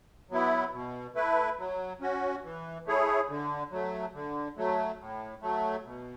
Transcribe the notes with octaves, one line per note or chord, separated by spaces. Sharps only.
F#3 B3 E4
B2
A3 E4 B4
F#3
C#4 F#4
E3
A3 E4 G#4 C#5
D3
F#3 A3
D3
F#3 A3
A2
F#3 A3
B2